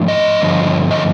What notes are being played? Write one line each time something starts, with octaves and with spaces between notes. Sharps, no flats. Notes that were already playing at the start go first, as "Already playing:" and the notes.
Already playing: G#2 F3 A3 D4
D#5
G2 D3 F3
D#5